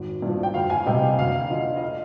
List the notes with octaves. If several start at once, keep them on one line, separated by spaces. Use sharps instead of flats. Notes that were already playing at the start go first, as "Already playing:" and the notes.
Already playing: G#1
G2 F3
G5
D2 F5
F5 G#5
C3 G3 D#5 G5
F5
D2 F5
D3 F3 D#5
D#5
F5